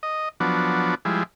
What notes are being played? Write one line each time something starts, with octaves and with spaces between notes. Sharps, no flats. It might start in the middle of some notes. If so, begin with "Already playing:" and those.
D#5
F3 F#3 B3 D4
F3 G3 G#3 E4